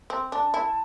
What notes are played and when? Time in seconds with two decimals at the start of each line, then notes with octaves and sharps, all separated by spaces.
0.10 C4
0.32 D4 A5
0.54 E4